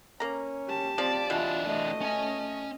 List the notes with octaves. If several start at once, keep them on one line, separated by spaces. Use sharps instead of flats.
A#3 C#4 A#5
G4 A5
F3 C4 D5
B2 E3 D4 F4
A3 D#5
C#4 G#5